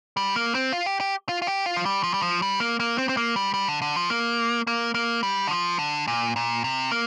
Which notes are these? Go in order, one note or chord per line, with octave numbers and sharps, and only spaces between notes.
G3
A#3
C4
F4
G4
G4
F4
F4
G4
F4
F3
G3
F3
G3
F3
G3
A#3
A#3
C4
C4
A#3
G3
G3
D3
D3
F3
A#3
A#3
A#3
G3
D3
F3
D3
A#2
A#2
C3
A#3